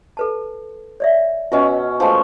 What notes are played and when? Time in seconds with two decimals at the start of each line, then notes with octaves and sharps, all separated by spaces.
0.17 A4 B4 A5
1.00 C#5 D5 E5
1.52 B2 C#4 F4 B4 D#5 E5
2.00 F3 G#3 A3